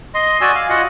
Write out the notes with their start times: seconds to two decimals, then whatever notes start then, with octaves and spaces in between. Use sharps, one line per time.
0.14 D#5 C6
0.41 F#4 D5 G#5 E6
0.55 F5
0.69 F4 F#4 D#5 F#5